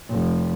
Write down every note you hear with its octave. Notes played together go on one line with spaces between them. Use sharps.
F1